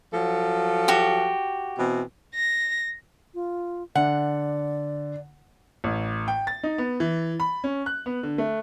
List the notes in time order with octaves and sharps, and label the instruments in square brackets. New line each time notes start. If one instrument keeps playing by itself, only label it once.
[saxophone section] F3 F#3 A4
[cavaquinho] F#4 G4
[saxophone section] B2 E3 C4
[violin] A#6
[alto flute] F4
[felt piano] D3 [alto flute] D5 [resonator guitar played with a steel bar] F#5
[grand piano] A1
G5
A6
D#4
B3
E3
B5
C#4
F#6
B3
D3
A3